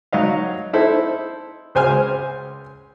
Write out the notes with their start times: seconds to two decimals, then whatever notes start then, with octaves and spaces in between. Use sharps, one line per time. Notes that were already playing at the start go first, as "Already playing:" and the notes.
0.13 F#3 D#4 D#5 F5
0.73 D#4 E4 A4 C5
1.75 C#2 C5 G#5 F6